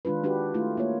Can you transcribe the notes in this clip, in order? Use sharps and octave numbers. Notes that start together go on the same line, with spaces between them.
D#3 G#3 D4 F4 B4
D4 F#4 G4 B4
A3 E4 F4
A#3 F4 C#5